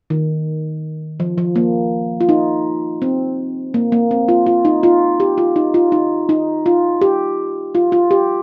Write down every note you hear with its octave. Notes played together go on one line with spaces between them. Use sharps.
D#3
F3
F3
A#3
F4
D#4
C4
A#3
A#3
C4
F4
F4
D#4
F4
G4
F4
D#4
F4
D#4
D#4
F4
G4
F4
F4
G4